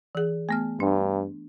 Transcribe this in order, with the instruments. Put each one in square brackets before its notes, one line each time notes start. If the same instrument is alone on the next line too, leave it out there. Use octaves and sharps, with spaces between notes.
[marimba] E3 G#4
A3 B3 F6
[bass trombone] G2 [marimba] D4